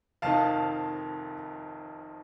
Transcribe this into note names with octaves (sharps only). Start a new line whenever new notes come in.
F1 F2 D#3 F5 A5